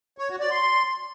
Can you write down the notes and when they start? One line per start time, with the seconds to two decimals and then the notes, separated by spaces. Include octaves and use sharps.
0.18 C#5
0.29 F#4
0.40 D5
0.51 C6